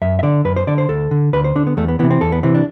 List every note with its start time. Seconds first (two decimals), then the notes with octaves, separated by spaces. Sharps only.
0.02 F#2 E5
0.19 E5
0.23 D3 D5
0.45 F#2 B4
0.56 C5
0.67 D3 D5
0.78 C5
0.89 D2 A4
1.11 D3
1.33 D2 B4
1.44 C5
1.56 D3 D4
1.67 B3
1.77 E2 A3
1.88 B3
1.99 C3 E3 B3
2.11 C4
2.21 E2 A4
2.32 B3
2.43 C3 E3 C4
2.54 D4